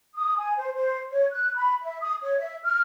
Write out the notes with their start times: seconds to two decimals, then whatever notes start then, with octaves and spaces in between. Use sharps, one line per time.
0.15 D#6
0.37 G#5
0.57 C5
0.76 C5
1.11 C#5
1.31 F#6
1.56 B5
1.83 E5
2.01 D#6
2.22 C#5
2.39 E5
2.63 F6